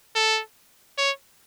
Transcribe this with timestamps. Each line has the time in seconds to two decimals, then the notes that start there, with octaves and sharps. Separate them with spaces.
0.16 A4
0.98 C#5